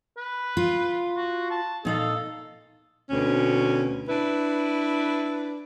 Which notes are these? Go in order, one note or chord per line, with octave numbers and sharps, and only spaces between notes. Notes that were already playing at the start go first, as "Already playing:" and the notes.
B4
F4
F#4
A5
A#2 D#4 A4 F5
D2 B2 C4 C#4
D4 E4 B4